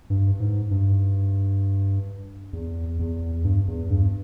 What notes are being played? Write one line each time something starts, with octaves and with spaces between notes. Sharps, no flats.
G2
G#2
G2
E2
E2
G2
E2
G2